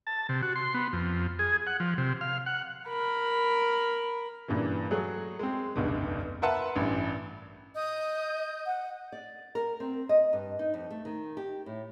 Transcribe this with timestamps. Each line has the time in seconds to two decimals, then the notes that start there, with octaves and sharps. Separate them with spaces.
0.07 A5
0.29 C3
0.42 F#4
0.55 C6
0.74 B3
0.93 F2
1.39 G#4
1.67 F#5
1.80 F3
1.98 C3
2.21 F5
2.46 F#5
2.89 A#4 B5
4.48 G2 A#2 C#3 E3
4.91 F#3 A3 F#4 G#4
5.39 G#3 C4
5.76 F1 C#2 G2 B2
6.42 A#4 B4 E5 F#5 A5 C6
6.75 A1 G2
7.75 D#5 D#6 G6
8.66 F#5
9.12 D5
9.55 A#4
9.80 C4
10.09 D#5
10.33 G2
10.59 D#4
10.74 F2
10.90 A3
11.05 D#3
11.37 G4
11.66 A2